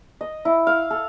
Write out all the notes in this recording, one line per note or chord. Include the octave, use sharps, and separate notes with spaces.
D#5
E4
F5
A4